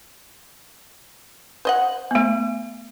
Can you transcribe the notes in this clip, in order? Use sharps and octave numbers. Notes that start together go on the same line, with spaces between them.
C5 D#5 F#5
A3 B3